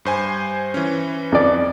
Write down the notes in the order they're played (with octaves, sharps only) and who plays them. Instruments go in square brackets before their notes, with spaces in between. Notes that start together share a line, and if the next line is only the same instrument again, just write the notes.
[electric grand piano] G2 C5 G#5
E3 C#4
[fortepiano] F2 D5